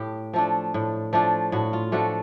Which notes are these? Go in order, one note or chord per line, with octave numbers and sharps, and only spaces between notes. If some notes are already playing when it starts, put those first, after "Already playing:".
Already playing: A2 G4
F3 A3 D4
A2
F3 A3 D4
A2 F#4
F4
F3 A3 D4 F#4